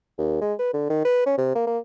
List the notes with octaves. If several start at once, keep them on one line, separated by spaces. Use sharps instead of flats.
D#2
G#3
B4
D3
D#3
B4
C#4
C3
A#3
A#3